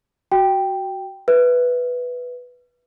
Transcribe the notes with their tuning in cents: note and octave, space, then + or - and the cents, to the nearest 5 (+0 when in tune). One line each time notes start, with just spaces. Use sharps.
F#4 +10 G5 +0
B4 +0 E5 +0